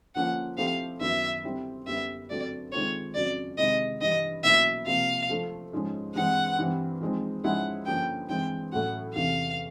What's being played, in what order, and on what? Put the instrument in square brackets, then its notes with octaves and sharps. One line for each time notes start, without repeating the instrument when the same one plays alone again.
[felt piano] D3 F3 A#3 C#4 F4 [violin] F#5
[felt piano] F3 A3 C4 E4 G4 [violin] F5
[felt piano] F#2 D#3 F#3 B3 E4 [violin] E5
[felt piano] D3 G3 C4 E4
[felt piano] F#2 D3 G3 B3 [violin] E5
[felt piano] G2 D3 F#3 A3 C4 [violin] D5
[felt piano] D#3 G#3 C4 F4 A4 [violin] C#5
[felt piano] F2 C#3 F#3 [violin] D5
[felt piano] C3 D#3 G#3 C4 E4 [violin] D#5
[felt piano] G2 E3 G3 [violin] D#5
[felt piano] B2 F#3 A#3 C#4 E4 [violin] E5
[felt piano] C3 F3 A#3 [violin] F5
[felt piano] F3 A3 D4
G#2 F3 G#3 C#4
[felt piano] G2 E3 G#3 C4 [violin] F#5
[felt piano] G2 E3 G3 C4
F3 G#3 C4 D#4
[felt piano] G#2 F3 G#3 C#4 E4 [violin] F#5
[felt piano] G2 D3 F3 A#3 C#4 [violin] G5
[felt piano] G2 E3 G#3 C4 [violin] G5
[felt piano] A2 F#3 A3 C#4 F#4 [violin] F#5
[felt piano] E2 C3 E3 A3 C#4 [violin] F5